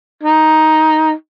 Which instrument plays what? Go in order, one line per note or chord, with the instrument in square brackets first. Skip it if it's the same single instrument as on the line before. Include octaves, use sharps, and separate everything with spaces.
[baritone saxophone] D#4